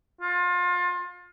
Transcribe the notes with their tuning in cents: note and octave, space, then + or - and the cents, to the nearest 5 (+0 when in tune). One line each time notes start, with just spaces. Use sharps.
F4 +30